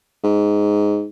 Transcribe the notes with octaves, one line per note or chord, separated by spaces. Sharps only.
G#2